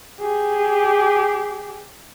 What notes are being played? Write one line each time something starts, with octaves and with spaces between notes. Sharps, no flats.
G4 G#4